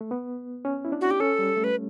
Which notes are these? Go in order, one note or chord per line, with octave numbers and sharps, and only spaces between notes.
A3
B3
C#4
E4
D4
F#4
G4
C#4 A4
G3
A3
B4